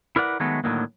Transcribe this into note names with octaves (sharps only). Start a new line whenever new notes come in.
E4 A#4 B4 D5 F#5
D#3 F#3 G#3 A3 B3
A2 D3 D#3 F#3 A#3